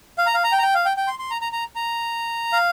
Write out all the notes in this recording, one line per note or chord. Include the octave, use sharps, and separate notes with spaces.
F5
A#5
F5
A#5
G5
A#5
G5
F5
G5
G5
C6
C6
A#5
A#5
A#5
A#5
F5